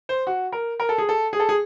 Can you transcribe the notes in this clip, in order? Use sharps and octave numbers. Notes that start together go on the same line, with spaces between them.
C5
F#4
A#4
A#4
A4
G#4
A4
G#4
A4
G#4